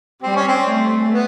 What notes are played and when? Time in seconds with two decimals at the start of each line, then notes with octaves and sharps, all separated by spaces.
0.23 G3 C4
0.36 C#4
0.48 C4
0.67 A3
1.12 B3